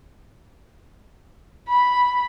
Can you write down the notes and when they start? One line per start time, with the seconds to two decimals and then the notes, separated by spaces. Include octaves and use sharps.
1.69 B5